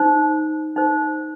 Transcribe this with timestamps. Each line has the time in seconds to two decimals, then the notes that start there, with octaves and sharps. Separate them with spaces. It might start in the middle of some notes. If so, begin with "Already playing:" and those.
Already playing: D#4 C5
0.76 D#4 C5